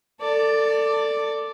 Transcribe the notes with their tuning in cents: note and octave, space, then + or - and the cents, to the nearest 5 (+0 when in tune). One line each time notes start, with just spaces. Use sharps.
A4 +25 D5 +0